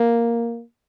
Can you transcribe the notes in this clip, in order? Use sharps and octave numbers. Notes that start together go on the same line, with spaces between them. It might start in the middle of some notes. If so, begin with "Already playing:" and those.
Already playing: A#3